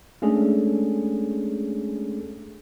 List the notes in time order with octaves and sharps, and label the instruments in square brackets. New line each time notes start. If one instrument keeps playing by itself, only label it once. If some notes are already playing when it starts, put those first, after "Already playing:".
[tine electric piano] G#3 A3 C#4 D4 G#4 A4